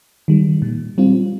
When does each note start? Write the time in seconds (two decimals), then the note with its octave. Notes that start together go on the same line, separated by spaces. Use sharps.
0.28 D#3 G3
0.62 A#2
0.98 G3 C4 F4